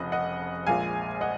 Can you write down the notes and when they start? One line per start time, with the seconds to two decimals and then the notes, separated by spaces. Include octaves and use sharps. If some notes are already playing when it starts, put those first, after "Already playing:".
Already playing: F1 F2 C#3 F3 D#5 F#5
0.12 D#5 F#5
0.66 A#1 A#2 G#3 F5 G#5
1.21 D#5 F#5